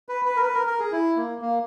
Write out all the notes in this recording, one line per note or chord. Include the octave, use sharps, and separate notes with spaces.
B4
B4
A#4
B4
A#4
A#4
G#4
E4
A#3
A#3